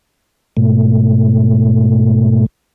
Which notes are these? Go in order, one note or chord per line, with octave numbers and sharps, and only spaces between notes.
G#2 B2 A3